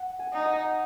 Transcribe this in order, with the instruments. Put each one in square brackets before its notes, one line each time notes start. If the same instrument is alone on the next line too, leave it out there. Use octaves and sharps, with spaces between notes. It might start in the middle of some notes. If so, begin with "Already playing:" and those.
Already playing: [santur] F#5
G#5
[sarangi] D#4
[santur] F#5